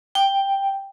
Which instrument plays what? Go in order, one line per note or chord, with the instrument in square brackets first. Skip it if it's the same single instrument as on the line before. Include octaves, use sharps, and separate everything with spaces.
[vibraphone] G5